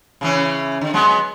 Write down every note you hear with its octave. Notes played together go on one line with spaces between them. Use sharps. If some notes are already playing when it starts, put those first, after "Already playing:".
C#3 E3 C#4
D3
F#3 G#3 B3